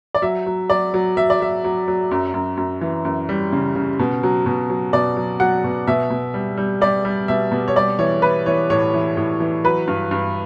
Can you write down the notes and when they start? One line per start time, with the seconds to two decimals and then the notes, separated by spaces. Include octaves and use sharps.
0.15 D5
0.22 F#3 E5
0.46 F#3
0.70 F#3 D5
0.94 F#3
1.17 F#3 E5
1.30 D5
1.40 F#3 E5
1.64 F#3
1.88 F#3
2.11 F#2
2.34 F#2
2.57 F#2
2.81 E3
3.05 F#2
3.29 G3
3.53 C#3
3.75 C#3
3.99 B2
4.23 F#3
4.46 B2
4.70 F#3
4.93 B2 D5
5.17 F#3
5.40 F#3 F#5
5.64 B2
5.87 B2 E5
6.10 B2
6.34 G3
6.57 G3
6.81 G3 D5
7.05 G3
7.28 B2 E5
7.52 B2
7.68 C#5
7.76 G3 D5
7.99 E3 C#5
8.22 E3 B4
8.46 E3 C#5
8.70 A2 C#5
8.94 E3
9.17 A2
9.40 E3
9.64 F#3 B4
9.88 G2
10.11 G2